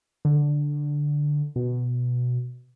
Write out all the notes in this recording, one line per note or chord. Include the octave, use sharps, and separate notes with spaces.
D3
B2